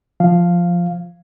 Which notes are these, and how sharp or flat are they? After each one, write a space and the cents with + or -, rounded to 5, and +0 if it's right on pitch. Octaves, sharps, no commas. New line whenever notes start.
F3 +0 F5 +0